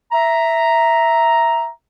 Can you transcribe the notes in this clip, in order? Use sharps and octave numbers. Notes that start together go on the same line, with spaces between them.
E5 A#5